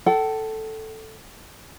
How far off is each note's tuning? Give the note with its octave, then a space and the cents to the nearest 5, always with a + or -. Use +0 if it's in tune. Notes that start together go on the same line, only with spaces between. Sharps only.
A4 +0 G5 -45